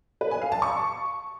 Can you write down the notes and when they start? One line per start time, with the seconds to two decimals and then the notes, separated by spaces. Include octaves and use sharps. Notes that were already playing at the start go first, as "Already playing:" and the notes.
0.21 B4
0.31 G#5
0.42 F5
0.52 A5
0.62 C#6